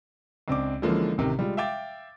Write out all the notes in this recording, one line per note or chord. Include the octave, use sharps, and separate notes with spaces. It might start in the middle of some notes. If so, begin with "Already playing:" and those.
C#2 C4 D4 D6
D3 E3 F3 G#3 A#3 C#4
A1 C3 D#3
G3 G#3 F4
E5 F5 G5 D6 A6